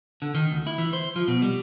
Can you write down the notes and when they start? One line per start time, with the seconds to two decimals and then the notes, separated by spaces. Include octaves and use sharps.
0.22 D3
0.35 D#3
0.51 D2
0.67 E4
0.78 E3
0.93 C5
1.16 F3
1.28 B2
1.42 G3